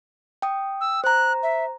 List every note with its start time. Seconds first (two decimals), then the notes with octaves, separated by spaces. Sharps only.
0.42 G5 D#6
0.81 E6
1.04 C5 A#5 F#6
1.43 E5